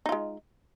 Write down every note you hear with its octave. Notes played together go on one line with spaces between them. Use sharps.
G#3 D#4 F4